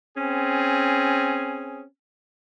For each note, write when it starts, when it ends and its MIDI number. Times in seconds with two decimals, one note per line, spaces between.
0.15 1.83 60
0.15 1.83 61
0.15 1.83 68